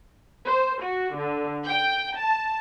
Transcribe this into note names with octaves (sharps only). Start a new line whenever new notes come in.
C5
F#4
D3
G5
A5